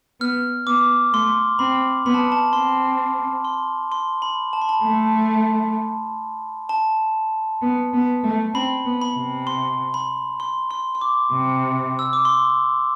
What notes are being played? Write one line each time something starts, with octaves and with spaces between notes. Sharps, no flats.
B3 F6
B3 D6
A3 C6
C4 B5
B3 B5
A5
A5
C4 C6
C6
C6
B5
A5
B5
A5
A3
A5
B3
B3
A3
C4 B5
B3
B5
C3
C6
B5
C6
C6
C6
D6
C3
E6
D6
C6